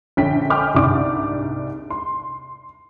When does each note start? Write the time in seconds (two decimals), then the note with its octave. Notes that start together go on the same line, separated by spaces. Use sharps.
0.17 A#1 D3 C#4 G5 B6
0.50 D#5 G5 G#5 D6 F6 G6
0.75 C2 G#2 D4 D6
1.90 C6